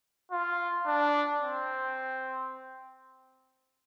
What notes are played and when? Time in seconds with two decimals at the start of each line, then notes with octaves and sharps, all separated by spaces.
0.31 F4
0.86 D4
1.41 C4